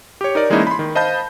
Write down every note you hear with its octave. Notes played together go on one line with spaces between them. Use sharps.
G4 C#5
D#4 A#4 D5
E3 G#3 A#3 C#4 D#4 E4
B5 C6
D#3
C5 D#5 F5 A5 B5 G6